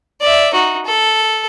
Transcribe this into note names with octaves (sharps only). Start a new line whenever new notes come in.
D5 E5
D#4 F#4
A4